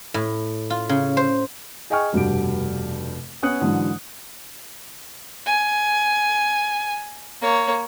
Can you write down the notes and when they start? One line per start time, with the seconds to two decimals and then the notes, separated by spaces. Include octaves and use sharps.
0.14 A2
0.70 F4
0.89 C#3
1.17 C5
1.90 G#4 D#5 G5 G#5 C#6 F6
2.13 F1 G2 B2 G4 D7
3.43 B3 C#4 D#6 F#6 C#7
3.61 G#2 D3 E3 F#3
5.46 G#5
7.41 A#3 C#5